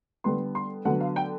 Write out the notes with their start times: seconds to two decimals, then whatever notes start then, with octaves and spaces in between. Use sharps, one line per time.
0.24 D3 G3 B3 C6
0.55 C6
0.85 D3 F#3 B3 F#5
1.00 F5
1.16 G5